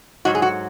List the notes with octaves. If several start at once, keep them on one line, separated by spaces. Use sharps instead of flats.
G#2 F#3 F#4
G#4
F#4